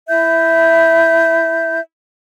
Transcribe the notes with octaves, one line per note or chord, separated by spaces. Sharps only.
E4 E5 G6